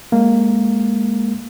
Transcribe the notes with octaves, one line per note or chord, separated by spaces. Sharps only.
G#3 A#3